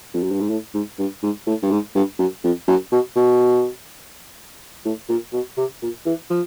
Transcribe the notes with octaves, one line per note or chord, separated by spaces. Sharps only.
F2
F#2
G2
G#2
A2
G#2
G2
G#2
A2
G2
G#2
G2
F#2
F2
F#2
B2
B2
A2
A#2
B2
C3
A#2
E3
F3